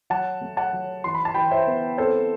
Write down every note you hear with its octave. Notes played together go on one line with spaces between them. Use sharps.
F#3 F#5 A5
A3
F#5 A5
F#3
E3 C6
B5
A5
E3 G5 B5
C5 E5
B3
C4 A4 C5